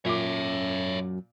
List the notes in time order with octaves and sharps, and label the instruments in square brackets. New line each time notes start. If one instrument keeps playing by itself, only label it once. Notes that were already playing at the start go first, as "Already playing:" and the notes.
[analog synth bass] F#2 [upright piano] A#2 D6 [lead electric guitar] C#5 E5